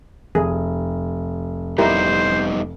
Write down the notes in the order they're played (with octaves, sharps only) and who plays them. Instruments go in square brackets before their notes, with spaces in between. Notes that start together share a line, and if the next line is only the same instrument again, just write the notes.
[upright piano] F1 [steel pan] G#4
[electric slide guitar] G3 B3 D#4 [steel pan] E4 G4 A#4 [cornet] C5